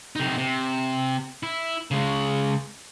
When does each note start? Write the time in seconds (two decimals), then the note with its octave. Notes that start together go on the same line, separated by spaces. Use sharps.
0.16 C3 D#4
0.38 C3
1.43 E4
1.91 C#3 G#3